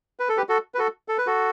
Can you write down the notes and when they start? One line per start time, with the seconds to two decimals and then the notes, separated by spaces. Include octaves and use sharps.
0.20 B4
0.29 A4
0.37 G4 B4
0.49 F#4 A4
0.74 B4
0.78 F#4 A4
1.08 A4
1.18 B4
1.27 F#4 A4